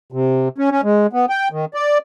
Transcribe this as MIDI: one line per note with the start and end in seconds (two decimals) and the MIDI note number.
0.12 0.48 48
0.58 0.71 61
0.71 0.81 61
0.84 1.07 56
1.13 1.26 59
1.30 1.48 79
1.52 1.65 51
1.74 1.98 74